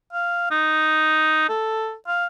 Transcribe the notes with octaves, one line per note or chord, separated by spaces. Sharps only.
F5
D#4
A4
F5